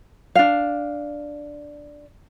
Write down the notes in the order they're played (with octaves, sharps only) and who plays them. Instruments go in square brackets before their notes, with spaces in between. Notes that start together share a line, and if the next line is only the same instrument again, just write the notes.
[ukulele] D4 F5